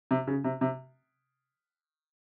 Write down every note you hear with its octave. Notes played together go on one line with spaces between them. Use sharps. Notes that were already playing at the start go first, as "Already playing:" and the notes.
C3
C#3
C3
C3